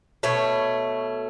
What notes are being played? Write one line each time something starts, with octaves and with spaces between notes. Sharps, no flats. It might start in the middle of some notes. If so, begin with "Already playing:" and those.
B2 A3 C#5